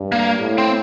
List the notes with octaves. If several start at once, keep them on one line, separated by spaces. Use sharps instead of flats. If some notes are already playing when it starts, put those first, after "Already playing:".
Already playing: G2
A#3
A2
C4